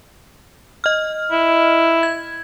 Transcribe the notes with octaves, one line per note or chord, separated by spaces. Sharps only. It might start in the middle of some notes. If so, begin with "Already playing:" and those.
D#5 F6
E4
G#6